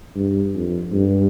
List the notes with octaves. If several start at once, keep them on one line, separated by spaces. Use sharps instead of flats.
G2
F2
G2